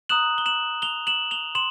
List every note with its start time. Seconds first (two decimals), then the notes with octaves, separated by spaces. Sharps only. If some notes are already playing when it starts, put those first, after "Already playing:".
0.09 A#5 D#6 F#6 E7 F#7
0.38 G7
0.46 E7 F#7
0.82 F7 G7
1.07 E7 F#7
1.31 F7 G7
1.55 C6 E7 F#7